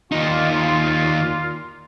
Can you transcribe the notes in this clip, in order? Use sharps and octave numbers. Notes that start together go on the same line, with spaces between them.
D#2 A#2 D#4 F4